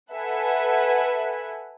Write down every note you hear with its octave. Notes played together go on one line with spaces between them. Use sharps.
A4 B4 E5 F#5 G#5